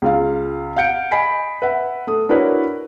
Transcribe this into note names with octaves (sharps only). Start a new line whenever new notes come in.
C#2 F4 F5
F5 F#5 G6 C#7 D7
D#5 G#5 B5 B6 C7 D7
B4 E5 F#5
A3 D#6
D4 E4 F#4 A#4 B4 C#5